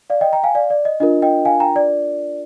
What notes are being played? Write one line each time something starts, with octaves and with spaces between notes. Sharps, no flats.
D5 F5
D#5 G5
G5 A#5
F5 G#5
D5 F5
D5
D#5
D4 F4 A#4 D#5
D#5 G5
F5 G#5
G5 A#5
D5